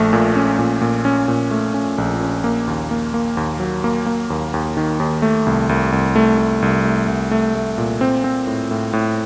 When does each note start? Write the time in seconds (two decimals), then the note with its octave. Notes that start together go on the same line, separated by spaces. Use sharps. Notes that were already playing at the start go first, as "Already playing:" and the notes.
Already playing: A#1 A3
0.13 A#2
0.36 C#4
0.59 A#2
0.82 A#2
1.05 C#4
1.28 A#2
1.51 A3
1.74 C#4
1.98 A#1
2.21 C#4
2.44 A#3
2.67 D#2
2.91 A#3
3.14 A#3
3.37 D#2
3.60 F#3
3.84 A#3
4.06 A#3
4.30 D#2
4.54 D#2
4.77 D#3
5.00 D#2
5.22 A3
5.46 C2
5.69 C2
5.92 C2
6.16 A3
6.38 A3
6.62 C2
6.85 A3
7.08 C2
7.31 A3
7.55 A3
7.78 A#2
8.01 C4
8.24 C4
8.47 A2
8.71 A2
8.93 A2